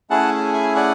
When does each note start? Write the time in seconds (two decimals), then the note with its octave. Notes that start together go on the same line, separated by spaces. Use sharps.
0.10 A3 C#4 E4 G#4 F#5 A5
0.54 E5 G#5
0.75 D5 F#5